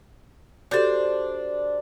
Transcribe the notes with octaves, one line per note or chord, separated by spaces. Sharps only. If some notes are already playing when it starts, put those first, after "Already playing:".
D4 F#4 G4 A4 C5